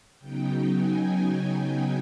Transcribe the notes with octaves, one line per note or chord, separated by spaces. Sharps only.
C#3 F#3 B3 D#4 G5
G#5